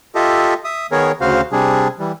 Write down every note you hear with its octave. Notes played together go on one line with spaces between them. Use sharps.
F4 G4 A4 D#5 E5
E5 D#6
D#3 B3 G#4 A#4 C#5
D2 C#3 F#4 C5 F5
C3 G3 D4 G#4
E3 G3